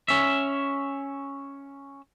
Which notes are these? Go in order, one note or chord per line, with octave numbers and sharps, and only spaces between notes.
C#4 E5